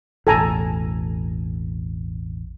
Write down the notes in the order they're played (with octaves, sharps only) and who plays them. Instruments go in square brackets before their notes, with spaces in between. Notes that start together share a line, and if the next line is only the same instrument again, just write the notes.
[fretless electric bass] E1 A1 [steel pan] A4 G#5 A#5